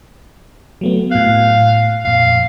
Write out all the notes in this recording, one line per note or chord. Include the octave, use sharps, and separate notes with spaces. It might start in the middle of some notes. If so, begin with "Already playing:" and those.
F#3 A3 B3
A2 F5 F#6
F2 A#2 F5